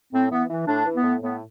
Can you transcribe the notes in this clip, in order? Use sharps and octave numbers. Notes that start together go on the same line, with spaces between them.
A2 C4
E3 B3
E3
A2 D4
E3
B3
A2
A2 B3